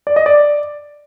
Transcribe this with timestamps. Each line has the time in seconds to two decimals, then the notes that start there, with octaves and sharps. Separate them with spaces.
0.07 D5
0.16 D#5
0.26 D5